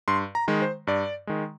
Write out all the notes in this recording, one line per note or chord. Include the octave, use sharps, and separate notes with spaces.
G2 C6
A#5
D#3 G#3
C5
G2 D5
D#3 G#3